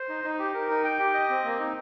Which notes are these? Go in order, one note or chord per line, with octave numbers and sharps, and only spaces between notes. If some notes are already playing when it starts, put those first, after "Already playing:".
Already playing: C5
D#4
D#4
G4
A#4
D#4
G5
G4
D#5
C4
A#3
D#4